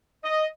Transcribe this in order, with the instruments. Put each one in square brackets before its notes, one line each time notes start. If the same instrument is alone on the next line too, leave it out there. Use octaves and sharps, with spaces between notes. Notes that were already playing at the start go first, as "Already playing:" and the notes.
[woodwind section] D#5